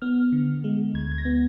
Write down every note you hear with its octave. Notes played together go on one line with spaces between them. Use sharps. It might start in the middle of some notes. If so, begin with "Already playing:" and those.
B3 F6
D3
G#3
D2 G#6
G#6
A#6
B3